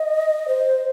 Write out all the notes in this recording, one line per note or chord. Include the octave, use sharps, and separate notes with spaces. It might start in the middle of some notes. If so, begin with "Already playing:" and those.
Already playing: D#5
C5